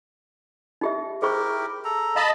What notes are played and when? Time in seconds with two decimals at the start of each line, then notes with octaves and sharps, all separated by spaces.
0.81 D#4 G4 E5
1.22 E4 G4 G#4 A#4 C5 C#6
1.85 A4 A#5
2.16 D#5 F5 A5 B5